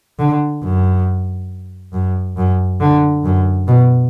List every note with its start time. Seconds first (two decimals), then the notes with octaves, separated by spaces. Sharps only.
0.19 D3
0.63 F#2
1.93 F#2
2.37 F#2
2.81 D3
3.25 F#2
3.68 B2